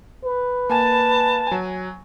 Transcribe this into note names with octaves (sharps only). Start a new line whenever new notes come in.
B4
A#3 G#5 A5 A6
F#3 G#5